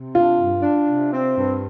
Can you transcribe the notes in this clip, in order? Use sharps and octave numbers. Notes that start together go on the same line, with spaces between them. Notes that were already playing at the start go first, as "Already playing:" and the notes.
Already playing: C3
D4 F4
G2
D4
C3
C4
G2